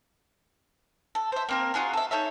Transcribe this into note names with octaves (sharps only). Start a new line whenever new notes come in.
A4
C5 E5
A#3 C4 A#4
F4 F#4 G#4 A#4
A4 E5
D#4 A4 C#5 E5